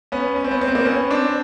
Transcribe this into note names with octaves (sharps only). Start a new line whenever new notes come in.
B3 C#4
C#4
C4
B3 C#4
C4
B3
A#3 C4
B3 C#4
C4 D4